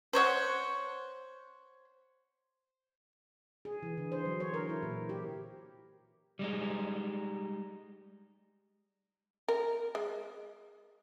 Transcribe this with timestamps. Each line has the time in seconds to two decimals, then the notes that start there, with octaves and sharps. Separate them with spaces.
0.13 C5 C#5 D#5 F#5
3.65 G#4
3.83 E3
3.97 D3
4.12 C5
4.25 F#3
4.40 C#5
4.54 A#4
4.69 E4
4.83 A#2
5.09 G4
6.39 G3 G#3 D#4
9.48 A#4
9.95 G#3